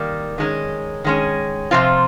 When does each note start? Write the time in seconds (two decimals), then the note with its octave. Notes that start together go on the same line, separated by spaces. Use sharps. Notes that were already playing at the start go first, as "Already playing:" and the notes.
Already playing: D#3 G3 A#3
0.38 D#3 G#3 C#4
1.04 D#3 G#3 C#4
1.71 C3 F3 C4 F4